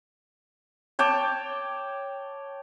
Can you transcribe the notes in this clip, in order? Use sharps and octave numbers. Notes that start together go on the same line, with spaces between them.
C#5 G5 A5 D6